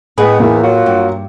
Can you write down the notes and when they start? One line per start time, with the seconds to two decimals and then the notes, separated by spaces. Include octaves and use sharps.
0.17 A2 G#3 B3 G#4 B4
0.40 E2 A#3
0.62 F#3 F4 F#4
0.86 G2